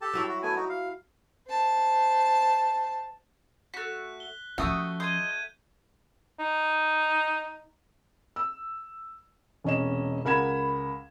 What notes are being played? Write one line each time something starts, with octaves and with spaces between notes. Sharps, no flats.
G4 A4 A5
F#3 E4 C#5
F#4
A3 B3 G#5
D#4 F#4
F5
C5 A5
A3 F#4 F#6 B6
G7
F3 A3 C#4 F#4 G5 D#6
D#5 C6 G6 G#6 D#7
D#4
E6
E1 C3 C#4 D#5 E7
C#2 A#4 F#5 B5 G#6 E7